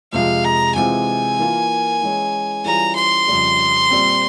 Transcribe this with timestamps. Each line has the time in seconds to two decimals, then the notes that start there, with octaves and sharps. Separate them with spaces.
0.13 F2 C3 F3 G#3 F5
0.44 A#5
0.76 C3 E3 G#3 C4 F4 G#5
1.39 E3 A#3 F4 A#4
2.02 E3 G#3 C#4 E4
2.65 E3 G3 C#4 F4 G#4 A#5
2.96 C6
3.28 F2 C#3 G3
3.91 A#2 G3 C4